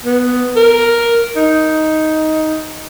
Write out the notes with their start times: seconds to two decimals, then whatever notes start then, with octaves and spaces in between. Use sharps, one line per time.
0.04 B3
0.56 A#4
1.36 D#4